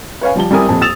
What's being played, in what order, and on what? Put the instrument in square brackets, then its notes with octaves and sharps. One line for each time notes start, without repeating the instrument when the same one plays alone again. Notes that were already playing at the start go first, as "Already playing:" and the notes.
[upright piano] B4 C#5 F5 G#5
F3 G3 A5 G7
G3 C4 E4 A#4 G#5 D#6
D#1 F2 A5
D#6 E6 A6 E7 F7